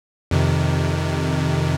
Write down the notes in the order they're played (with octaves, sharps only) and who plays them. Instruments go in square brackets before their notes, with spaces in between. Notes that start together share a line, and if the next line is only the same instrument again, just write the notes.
[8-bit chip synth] F2 C3 D#3